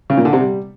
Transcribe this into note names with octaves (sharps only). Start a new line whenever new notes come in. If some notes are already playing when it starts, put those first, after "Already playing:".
C#3
A#2
D3
C3
G3